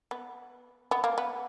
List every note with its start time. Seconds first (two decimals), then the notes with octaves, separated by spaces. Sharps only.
0.11 B3
0.91 B3
1.04 A#3
1.18 B3